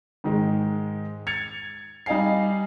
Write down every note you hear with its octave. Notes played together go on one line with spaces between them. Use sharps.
G#2 D#3 G#3
G#6 A6 C#7 F7
G3 D#4 D#5 F5 G#5 C7